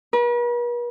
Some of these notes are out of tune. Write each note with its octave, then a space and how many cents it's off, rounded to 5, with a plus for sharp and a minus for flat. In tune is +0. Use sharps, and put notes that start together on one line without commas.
B4 -45